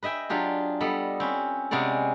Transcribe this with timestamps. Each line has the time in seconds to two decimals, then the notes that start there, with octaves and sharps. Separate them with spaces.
0.03 B4 D#5 E5 G5 G#5
0.29 F#3 D4 F4 G4 G#4
0.80 G3 B3 A4 D#5 B5
1.20 C4 C#4 B4
1.71 C3 G#3 B3 C#4 D5